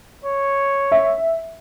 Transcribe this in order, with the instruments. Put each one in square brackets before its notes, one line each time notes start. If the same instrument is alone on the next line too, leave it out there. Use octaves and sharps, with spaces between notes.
[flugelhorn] C#5
[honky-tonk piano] E5